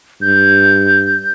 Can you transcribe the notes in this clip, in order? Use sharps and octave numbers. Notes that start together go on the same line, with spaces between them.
G2 G6